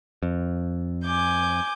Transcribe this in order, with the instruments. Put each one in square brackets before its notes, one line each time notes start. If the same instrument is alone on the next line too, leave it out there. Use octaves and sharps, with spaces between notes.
[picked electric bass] F2
[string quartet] G#5 D6 G6